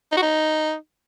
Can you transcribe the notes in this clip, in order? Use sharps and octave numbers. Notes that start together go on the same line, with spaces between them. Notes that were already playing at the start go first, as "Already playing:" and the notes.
D#4
F#4
D#4